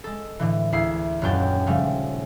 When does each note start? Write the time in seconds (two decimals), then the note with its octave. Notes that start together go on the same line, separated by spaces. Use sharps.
0.04 G#3 A4
0.39 A2 D3 E3
0.72 D2 E4 G#4 C7
1.22 D#1 F#2 F#3 G5 A6
1.67 C#3 F3 G3 A3